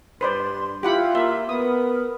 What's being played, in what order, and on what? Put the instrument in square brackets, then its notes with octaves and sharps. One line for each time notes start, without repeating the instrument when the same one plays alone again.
[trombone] G2 [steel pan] B4 C5 D5 [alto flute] C6
[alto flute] E4 [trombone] F4 [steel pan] G4 F#5 B5
[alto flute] A#3 [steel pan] E5
[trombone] B3 [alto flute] A#4 [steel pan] D#6